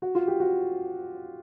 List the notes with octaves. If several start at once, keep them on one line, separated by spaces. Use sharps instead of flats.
F#4
F4
G4
F#4